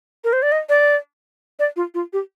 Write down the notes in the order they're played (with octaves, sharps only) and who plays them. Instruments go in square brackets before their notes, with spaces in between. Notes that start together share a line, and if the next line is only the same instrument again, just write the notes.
[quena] A#4
C5
D5
D#5
D5
D5
F4
F4
G4